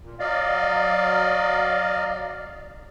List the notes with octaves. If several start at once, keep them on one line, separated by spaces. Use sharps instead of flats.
A#2
F#3 D5 D#5 F5